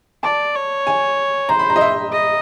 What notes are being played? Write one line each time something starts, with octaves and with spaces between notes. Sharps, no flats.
D5 A5
C#5
G#5
C5 A#5
B5
A#5
D#5
E5
D#5